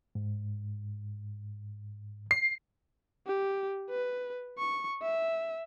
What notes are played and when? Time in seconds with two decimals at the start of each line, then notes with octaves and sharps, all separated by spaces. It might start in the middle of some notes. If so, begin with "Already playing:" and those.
0.15 G#2
2.31 C7
3.27 G4
3.90 B4
4.59 C#6
5.02 E5